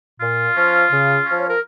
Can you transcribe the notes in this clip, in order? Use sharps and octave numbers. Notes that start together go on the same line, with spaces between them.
A#2 F4
F3 C#4
C#3
F3 C#4
C#5
A#4